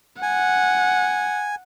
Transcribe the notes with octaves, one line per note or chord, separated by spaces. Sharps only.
F#5 G#5